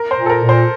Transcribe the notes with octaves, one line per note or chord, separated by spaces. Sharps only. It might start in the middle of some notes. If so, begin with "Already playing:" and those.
Already playing: A#4
C5
A#2
A4
A#4
A#2
C5